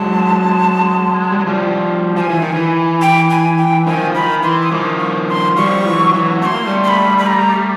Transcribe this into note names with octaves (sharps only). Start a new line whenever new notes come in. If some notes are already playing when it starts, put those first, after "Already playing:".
Already playing: F#3 G#3 A5
G3
F#3
F3 G3
F3 G#5 A5
E3
D#3
E3
G5
G#5
G5
D#3 F3 G#5
D#3 B5
E3 C6
D#6
D#3 F3 D6
C#6
C6
F3 G3 C#6
E3 F#3
E3 F#3
A3 C6 C#6
A#3
G3 A3
C6
B5
B5
A#5